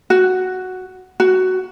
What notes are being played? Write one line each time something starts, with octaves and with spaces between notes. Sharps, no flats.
F#4
F#4